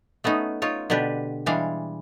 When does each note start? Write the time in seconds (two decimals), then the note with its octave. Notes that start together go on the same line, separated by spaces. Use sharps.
0.24 A3 B3 C#4 D#4
0.62 D#4 F4 C#5
0.90 B2 D3 D4 G4 B4
1.46 E3 G3 G#3 D4 F5